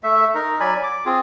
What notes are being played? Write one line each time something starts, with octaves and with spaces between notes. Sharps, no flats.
A3 E5
D#4 A#4
F#3 D5 G#5 B5
D6
C4 F4 G#4